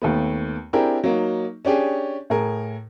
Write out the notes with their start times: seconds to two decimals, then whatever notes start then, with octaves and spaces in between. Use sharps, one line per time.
0.02 D#2 A3 B3
0.73 C4 D4 E4 G4 G#4 A#4
1.04 F#3 A#3 D#4
1.65 C#4 D4 G4 G#4
2.30 A2 G#4 A#4